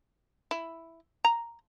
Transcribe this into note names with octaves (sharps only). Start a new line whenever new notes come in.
E4
A#5